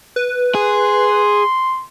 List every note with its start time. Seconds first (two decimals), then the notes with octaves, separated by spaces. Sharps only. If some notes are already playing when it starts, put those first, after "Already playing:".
0.16 B4
0.55 G#4 C6